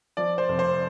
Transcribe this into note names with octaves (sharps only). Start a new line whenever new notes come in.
F3 D5
C5
F1
C5